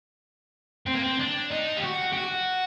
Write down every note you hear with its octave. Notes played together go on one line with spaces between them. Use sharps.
C4
A#3
C4
D4
D#4
G4
F#4
G4
F#4